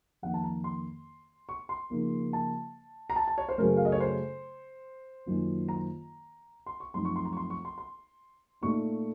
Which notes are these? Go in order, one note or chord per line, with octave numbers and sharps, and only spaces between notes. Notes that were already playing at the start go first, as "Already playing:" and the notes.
F2 D#3 A#3 F#5
A5
A#5
C6
C#6
C6
C#3 F3 A#3 D#4
A5
A#5
A5
A5
C#5
C5
F#2 C#3 F#3 A3 A#4
F5
D#5
C#5
C5
F#2 D#3 A#3 F4
A#5
C6
C#6
F#2 F3 A3 C4 D#4 C6
C#6
C6
A#5
C#6
C6
C#6
C6
C6
A#2 A3 D#4 C#6